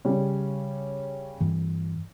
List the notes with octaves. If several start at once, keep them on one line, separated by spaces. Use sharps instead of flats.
C#3 G3 C#4
G2 E3